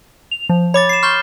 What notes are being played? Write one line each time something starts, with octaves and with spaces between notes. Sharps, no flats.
F7
F3
C#5 B5 D6 A6
C7 E7
C6 C#6 F6 G6 G7